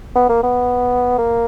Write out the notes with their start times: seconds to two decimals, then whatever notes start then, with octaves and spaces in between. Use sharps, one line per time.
0.16 B3
0.29 A#3
0.43 B3
1.18 A#3